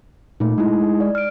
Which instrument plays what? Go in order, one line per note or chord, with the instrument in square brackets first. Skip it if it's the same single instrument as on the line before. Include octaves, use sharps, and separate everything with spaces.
[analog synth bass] A#2 [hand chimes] A3 D#4
[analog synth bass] G#3 [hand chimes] D#4 E4
[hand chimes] D5
F6 D7